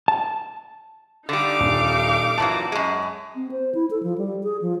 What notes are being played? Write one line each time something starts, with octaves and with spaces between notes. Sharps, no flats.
A5
D3 G3 D#4 F5 D6
D#1
A#2 E3 F#3 A5
F#2 G#3
C4
C5
E4
A4
F3
G3
G#4
F3